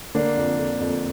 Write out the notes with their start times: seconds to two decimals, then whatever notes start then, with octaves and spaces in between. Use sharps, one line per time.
0.15 D3 A#3 D4
0.37 F2
0.59 D3
0.80 F2